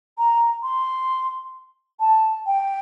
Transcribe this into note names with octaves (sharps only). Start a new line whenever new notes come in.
A#5
C6
A5
G5